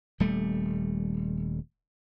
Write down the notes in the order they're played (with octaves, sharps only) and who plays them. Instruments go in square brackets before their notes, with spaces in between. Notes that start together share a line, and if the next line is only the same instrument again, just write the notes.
[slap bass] D#1 G3 A3